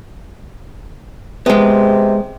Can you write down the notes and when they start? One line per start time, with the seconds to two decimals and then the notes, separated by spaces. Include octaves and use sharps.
1.46 C3 G#3 B3